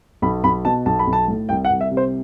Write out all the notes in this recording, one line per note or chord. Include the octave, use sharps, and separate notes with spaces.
B1 B5
B1 B5
B2 A5
B1 A5
B5
B1
A5
A2
C2 G5
F#5
C2
E5
C3
C5